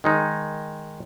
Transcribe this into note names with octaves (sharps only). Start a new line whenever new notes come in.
D#3 G#3 D#4